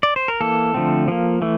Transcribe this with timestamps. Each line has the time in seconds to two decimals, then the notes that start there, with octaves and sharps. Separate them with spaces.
0.03 D5
0.16 C5
0.28 A#4
0.41 E3 A#3 A4
0.74 D3 F3 A3 C4
1.08 F3 A#3
1.42 E3 A3